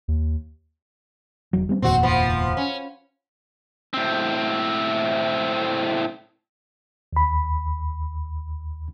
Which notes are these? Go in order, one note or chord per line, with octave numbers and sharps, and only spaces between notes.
D#2
F1 F#3
G3 B3 C4
F1 D#2 A#2 C4 F#4
F3 B3
C#4
A2 C4
D#2 B5